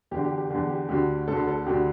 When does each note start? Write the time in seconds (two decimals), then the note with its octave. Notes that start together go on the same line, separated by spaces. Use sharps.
0.11 E2 D3 G4
0.25 G4
0.38 G4
0.50 E2 D3 G4
0.70 G4
0.89 D2 D3 G4
1.28 D2 D3 A4
1.47 A4
1.66 D2 D3 G4